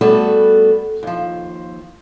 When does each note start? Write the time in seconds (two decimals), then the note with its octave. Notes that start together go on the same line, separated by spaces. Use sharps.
0.01 G3 A3 B3 F#4 G#4 A4
1.03 D#2 F3